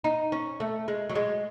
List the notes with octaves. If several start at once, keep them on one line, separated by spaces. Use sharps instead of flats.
D#4
C#4
A3
G#3
F#3
G#3